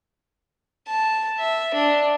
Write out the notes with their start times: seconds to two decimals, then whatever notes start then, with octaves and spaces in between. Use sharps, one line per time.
0.88 A5
1.40 E5
1.74 D4